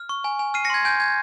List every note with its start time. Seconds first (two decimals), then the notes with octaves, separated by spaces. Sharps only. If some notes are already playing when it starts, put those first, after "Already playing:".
Already playing: F6
0.09 C#6
0.24 G#5
0.39 G#5
0.54 F6 C7 D#7
0.65 A#6 C#7
0.70 C6 G#6
0.85 G#5 G6
1.00 G#5 G#6